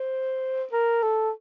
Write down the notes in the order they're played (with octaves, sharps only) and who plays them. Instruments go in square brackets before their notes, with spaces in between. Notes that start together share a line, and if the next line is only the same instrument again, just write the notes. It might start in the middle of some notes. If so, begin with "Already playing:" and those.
Already playing: [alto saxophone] C5
A#4
A4